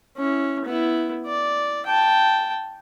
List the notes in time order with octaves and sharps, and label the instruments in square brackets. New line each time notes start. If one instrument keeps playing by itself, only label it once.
[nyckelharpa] C#4 E4
B3 E4
D5
G5 A5